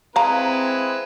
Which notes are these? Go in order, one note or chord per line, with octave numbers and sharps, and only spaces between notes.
G#3 C4 E4 B4 F5 A#5